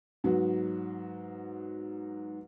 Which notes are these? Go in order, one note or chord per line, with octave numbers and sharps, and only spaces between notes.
G#2 F#3 B3 F#4